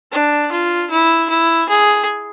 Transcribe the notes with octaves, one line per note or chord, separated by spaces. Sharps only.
D4
F4
E4
E4
G#4